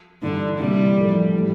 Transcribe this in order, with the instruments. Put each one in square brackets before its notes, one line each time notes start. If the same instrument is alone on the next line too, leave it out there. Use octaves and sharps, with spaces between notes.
[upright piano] G2 E3 A3 [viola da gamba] D3
[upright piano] C3 E3 A#3 E4 [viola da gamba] G3
[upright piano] A2 F3 A3
A2 E3 G3